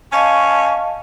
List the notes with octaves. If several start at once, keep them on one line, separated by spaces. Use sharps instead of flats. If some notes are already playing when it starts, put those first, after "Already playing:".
C#4 D#5 F5 A5 C#6